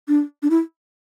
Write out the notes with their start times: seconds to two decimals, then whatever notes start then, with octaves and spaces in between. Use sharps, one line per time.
0.08 D4
0.43 D4
0.50 E4